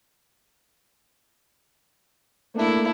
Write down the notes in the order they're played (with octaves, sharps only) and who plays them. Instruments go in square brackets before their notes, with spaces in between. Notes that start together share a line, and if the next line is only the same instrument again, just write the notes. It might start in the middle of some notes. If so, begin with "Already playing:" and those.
[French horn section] A3 A#3 [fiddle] D4 E4